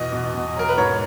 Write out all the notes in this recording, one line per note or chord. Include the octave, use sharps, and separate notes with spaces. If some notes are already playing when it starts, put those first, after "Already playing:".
Already playing: E2 B2 D#5
B2
B2
F#3 A#4
B4
G#2 C#5